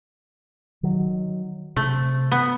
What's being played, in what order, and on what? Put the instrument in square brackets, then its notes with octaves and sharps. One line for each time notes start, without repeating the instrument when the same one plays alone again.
[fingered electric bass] D#3 F#3
[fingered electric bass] C3 [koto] A3
[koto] B3